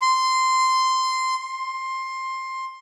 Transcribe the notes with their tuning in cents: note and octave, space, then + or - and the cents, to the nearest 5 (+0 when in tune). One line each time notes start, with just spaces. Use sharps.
C6 -10
C6 +10